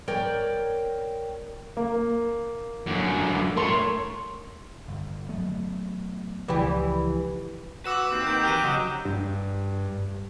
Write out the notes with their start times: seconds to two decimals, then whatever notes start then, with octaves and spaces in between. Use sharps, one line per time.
0.08 A#4 C#5 D5 G5
1.77 A#3
2.86 F#2 D3
3.56 A2 A#4 C#5 C6
4.88 G1
5.28 F#3 A3 B3
6.48 C#2 E3 F3 G4
7.85 F#4 B4 D6 E6 E7
8.11 D#2 C4
8.27 D#3 G6
8.44 E2 G4 A#5 F#6 D#7
8.64 C#3 F#3 D#5
9.05 G2